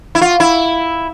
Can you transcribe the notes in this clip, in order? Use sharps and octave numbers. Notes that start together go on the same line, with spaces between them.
E4
F4
E4